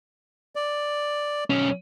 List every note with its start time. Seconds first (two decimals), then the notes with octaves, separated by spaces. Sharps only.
0.55 D5
1.50 B1 C#4